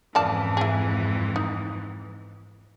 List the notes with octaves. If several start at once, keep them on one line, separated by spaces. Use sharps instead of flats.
F2 G#2 C#3 E3 D5 A5
E4 G#4
D#4